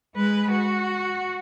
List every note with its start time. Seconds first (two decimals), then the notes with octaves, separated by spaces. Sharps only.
0.16 G#3 B4
0.51 F#4